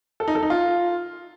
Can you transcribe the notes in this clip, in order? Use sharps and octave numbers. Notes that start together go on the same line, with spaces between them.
A4
D#4
A4
D#4
F4